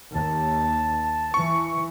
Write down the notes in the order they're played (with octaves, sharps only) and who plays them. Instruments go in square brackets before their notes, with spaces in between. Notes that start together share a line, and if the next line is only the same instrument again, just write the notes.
[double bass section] D#2 [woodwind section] A5
[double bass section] E3 [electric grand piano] C#6